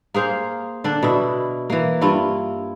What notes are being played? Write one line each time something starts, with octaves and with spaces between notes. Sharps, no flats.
A#3 G#4 C5 F5
D3 D4 D5
B2 E4
E3 A#3
G2 E4 F4